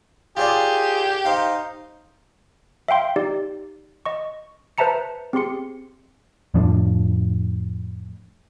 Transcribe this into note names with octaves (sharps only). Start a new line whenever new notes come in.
F4 G4 G#4 C#5 D5
D#4 C5 F5
E5 F5 G5 C6
D#4 G4 D5
D#5 C#6
B4 C5 E5 A5 A#5 C#7
C4 G4 G#4 C6 C#7
F2 A2 F3 D4